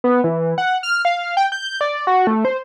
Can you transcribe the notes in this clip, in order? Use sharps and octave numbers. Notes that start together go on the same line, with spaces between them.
B3
E3
F#5
F6
F5
G5
G6
D5
F#4
A3
C5